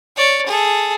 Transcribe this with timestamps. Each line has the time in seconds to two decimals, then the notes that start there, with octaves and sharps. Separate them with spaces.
0.16 C#5 D5
0.46 G#4 A4